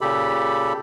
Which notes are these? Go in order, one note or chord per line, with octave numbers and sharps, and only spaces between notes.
A#2 C#3 G4 A4 B5